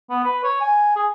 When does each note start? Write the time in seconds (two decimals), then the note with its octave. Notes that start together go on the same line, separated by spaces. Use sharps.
0.10 B3
0.24 B4
0.44 C#5
0.61 G#5
0.96 G#4